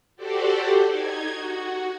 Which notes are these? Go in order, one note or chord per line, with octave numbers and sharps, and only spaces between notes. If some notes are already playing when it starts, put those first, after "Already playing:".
F#4 G4 A4 C5 D5
D#4 G#6
F#4